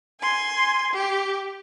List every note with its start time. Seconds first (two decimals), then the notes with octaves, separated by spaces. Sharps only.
0.21 G#5 C6
0.93 G4